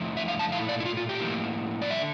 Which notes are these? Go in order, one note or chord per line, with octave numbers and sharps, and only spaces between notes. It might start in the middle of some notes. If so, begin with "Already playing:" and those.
Already playing: F2 D3 F3 A3 E4
E5
F5
A5
A#2 A3 E4 F5
D5
E4
F4
F4
G4
A2 F3 A#3 E4
D5
D3 G3 E5